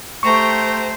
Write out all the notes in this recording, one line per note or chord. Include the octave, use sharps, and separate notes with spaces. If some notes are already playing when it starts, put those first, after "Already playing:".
A3 G4 C5 G5 A#5 C#6